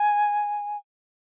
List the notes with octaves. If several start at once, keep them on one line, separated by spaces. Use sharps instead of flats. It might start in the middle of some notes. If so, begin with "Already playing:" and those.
Already playing: G#5